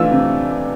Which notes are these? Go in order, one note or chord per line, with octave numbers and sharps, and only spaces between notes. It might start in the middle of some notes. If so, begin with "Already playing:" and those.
Already playing: E3 A3 D4 F4 E6
C3